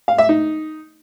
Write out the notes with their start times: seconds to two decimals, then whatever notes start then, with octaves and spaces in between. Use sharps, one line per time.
0.08 F5
0.18 E5
0.29 D#4